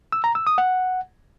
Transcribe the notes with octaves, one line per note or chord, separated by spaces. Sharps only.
E6
A#5
E6
D#6
F#5